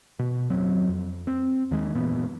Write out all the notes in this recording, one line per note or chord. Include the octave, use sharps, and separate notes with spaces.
B2
F#1 D#2 F#3 C4
F2
C4
D#2 D#3 G#3
F#2 A#2 E3 B3